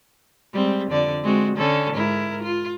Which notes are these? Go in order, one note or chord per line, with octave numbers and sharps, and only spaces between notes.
G3 G#3 C4
F2 D3 D5
G#3 C4 F#4
D3 C#4 A4
G#2 E4 A#4
F4